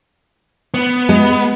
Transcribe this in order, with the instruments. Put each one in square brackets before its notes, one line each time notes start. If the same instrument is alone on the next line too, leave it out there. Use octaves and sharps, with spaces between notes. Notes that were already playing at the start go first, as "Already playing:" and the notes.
[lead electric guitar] B3
[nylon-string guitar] G#3